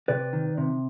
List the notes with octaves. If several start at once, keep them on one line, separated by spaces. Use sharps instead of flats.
C3 B4 D5
D#3
C3